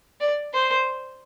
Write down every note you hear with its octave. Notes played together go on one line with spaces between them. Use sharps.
D5
C5